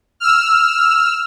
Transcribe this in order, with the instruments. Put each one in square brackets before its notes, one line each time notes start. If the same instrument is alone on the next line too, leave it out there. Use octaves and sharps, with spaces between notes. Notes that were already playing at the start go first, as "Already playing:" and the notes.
[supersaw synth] E6 F6